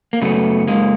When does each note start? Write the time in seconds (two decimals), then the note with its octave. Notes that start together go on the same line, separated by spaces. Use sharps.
0.13 A#3
0.21 F#2 C#3 F#3 A3 B3
0.68 G#3 A#3